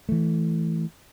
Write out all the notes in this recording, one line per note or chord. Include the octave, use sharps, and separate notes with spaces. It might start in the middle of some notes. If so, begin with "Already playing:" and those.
E3 A3